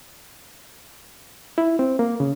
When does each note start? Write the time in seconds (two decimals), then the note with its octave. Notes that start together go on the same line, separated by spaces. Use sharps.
1.58 E4
1.79 C4
1.99 A#3
2.20 C#3